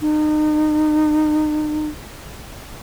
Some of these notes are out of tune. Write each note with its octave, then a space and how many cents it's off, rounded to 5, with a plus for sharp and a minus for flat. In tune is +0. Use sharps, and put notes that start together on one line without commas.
D#4 -35